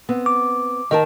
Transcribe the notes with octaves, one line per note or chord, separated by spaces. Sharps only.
B3 C4
D6
D#3 A#4 D#5 A5